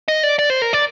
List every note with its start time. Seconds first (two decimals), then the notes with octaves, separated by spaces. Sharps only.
0.08 D#5
0.23 D5
0.39 D5
0.50 C5
0.62 A#4
0.73 D5